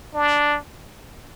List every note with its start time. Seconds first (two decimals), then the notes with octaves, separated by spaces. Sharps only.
0.14 D4